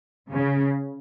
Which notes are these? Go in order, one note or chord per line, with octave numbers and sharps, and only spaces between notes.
C#3